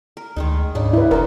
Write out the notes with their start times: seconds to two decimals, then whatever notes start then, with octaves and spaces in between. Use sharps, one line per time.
0.17 A#4
0.36 D2 D#3 G#3 D#4
0.75 G#2 C#3 D4 D#4
0.93 E4 B4
1.11 F#1 D3 D#4 A#4 C5